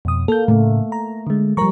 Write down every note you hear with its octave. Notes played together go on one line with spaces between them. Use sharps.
F2 B2 D#6
A#3 A4 G6
A2 C#3 A3
A#5
D3 G#3
F3 G3 A#4 A#5 C#6